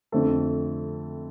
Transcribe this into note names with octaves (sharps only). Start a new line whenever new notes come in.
F2 D3 A3 C4 A4